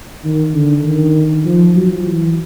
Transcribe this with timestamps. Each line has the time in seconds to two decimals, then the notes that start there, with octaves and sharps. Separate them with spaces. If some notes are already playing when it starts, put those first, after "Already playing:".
0.24 D#3
0.54 D3
0.85 D#3
1.45 F3
1.75 F#3
2.06 E3